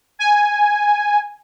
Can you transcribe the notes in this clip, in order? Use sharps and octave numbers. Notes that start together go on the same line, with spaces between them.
G#5